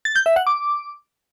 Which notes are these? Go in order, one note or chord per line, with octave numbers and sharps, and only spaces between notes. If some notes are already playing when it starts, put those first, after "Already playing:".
A6
G6
E5
F#5
D6